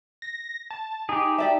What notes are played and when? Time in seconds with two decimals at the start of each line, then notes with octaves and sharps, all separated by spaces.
0.22 A#6
0.70 A5
1.09 D#4 G4 G#4
1.38 G4 D5 E5 A5